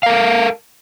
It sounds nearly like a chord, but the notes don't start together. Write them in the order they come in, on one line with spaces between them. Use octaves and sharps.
F5 A#4 A4